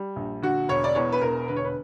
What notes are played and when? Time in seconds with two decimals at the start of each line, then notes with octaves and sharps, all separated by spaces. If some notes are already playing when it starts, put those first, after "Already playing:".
Already playing: G3
0.16 A#1
0.42 D3 F#4
0.69 E1 C#5
0.84 D5
0.95 E2 C#5
1.12 B4
1.21 E1 A#4
1.48 D3 B4
1.56 C#5
1.64 B4